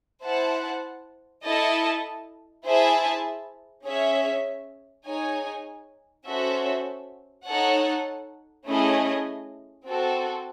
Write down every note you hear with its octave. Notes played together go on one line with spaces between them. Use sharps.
E4 C5 F#5 A5
E4 A4 D#5 A5
E4 G#4 C5 E5 A5
C#4 G#4 C#5 E5
D#4 G#4 C#5 G#5
C#4 F#4 A4 C5 E5
D#4 A4 C#5 F#5
A3 C#4 E4 G#4 D#5
C4 F#4 A4